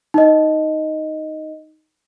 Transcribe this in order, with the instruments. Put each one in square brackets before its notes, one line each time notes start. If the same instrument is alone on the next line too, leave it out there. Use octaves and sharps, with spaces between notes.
[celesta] D#4 D#5